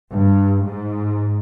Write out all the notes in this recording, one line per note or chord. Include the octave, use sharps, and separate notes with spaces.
G2
G#2